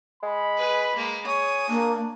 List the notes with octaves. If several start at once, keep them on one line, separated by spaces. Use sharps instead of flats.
G#3 B5
G#4 B4
G#3 A#3
G#4 C#5 D#6
A#3 D4